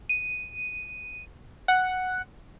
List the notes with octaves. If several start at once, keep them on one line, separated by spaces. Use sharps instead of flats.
D#7
F#5